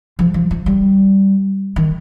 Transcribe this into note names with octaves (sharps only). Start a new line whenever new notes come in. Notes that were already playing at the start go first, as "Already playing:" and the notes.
F3
F3
F3
G3
D#3